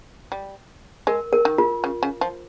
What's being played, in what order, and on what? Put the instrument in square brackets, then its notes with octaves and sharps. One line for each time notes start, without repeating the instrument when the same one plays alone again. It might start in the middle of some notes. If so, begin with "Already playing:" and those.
[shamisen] G3
[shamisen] G#3 [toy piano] A#4
[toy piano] A#4
[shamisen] D#3
[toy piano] F4
[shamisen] C#3
C#3
F3